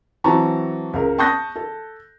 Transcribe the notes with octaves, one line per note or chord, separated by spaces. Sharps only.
E3 F#3 C4 A5 A#5 C#6
C#2 A#4
A5 C#6 D#6 F#6 G6 A#6
A4